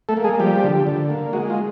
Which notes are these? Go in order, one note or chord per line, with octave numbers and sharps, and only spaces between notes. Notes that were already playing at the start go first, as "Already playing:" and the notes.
A3 A4
A#3
G#3 G#4
F3 G3 G4
D3
D3
A#3
G#3 F#4
F4